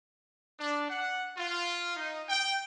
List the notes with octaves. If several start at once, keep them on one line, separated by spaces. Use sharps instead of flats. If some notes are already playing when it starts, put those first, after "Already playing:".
D4
F#5
F4
D#4
G5